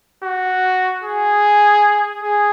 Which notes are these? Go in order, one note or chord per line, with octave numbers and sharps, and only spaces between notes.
F#4
G#4
G#4